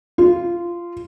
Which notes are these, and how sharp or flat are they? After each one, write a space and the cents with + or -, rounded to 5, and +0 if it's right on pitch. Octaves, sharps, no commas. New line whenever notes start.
F4 -15